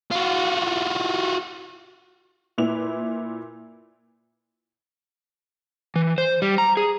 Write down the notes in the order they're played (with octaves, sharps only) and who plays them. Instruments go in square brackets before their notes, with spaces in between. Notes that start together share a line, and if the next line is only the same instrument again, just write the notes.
[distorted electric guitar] F4 F#4
[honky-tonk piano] A#2 E4 B4 F7
[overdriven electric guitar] E3
C5
G3
A#5
G#4